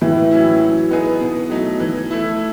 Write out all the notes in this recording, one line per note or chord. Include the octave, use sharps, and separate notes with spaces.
A2 E3
F#3 C#4 E4
F#3
B3 D#4 G#4 B4
B2
F#3 A3 D#4
E3
A3 E4